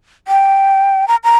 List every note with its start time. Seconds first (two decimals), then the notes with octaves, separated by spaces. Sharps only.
0.28 G5
1.08 A#5
1.24 A#5